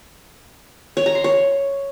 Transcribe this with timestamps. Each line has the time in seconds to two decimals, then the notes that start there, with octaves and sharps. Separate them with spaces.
0.97 C#5
1.06 A#5
1.15 C6
1.24 C#5